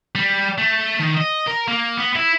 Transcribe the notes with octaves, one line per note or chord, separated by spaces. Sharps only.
G3
A3
D#3
D#5
A#4
A#3
B3
E4